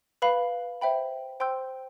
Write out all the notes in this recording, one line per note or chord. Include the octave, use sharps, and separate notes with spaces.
B4 F5 B5
C5 E5 G5 B5
C5 G5 C6 E6 G6